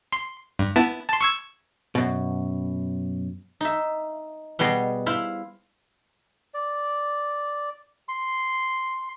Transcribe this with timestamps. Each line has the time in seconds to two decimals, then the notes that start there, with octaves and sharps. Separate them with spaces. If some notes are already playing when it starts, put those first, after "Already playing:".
0.12 C6
0.59 G2
0.76 B3 E4 A5
1.09 A5 C6
1.21 C#6 E6 G#6
1.95 F#2 B2
3.61 D#4 E5
4.59 B2 G3 B3 G#4 D#5
5.06 E4 C5 F5 B5
6.54 D5
8.09 C6